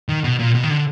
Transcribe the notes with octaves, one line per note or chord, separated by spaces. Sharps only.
D#3
B2
A#2
B2
D#3
D3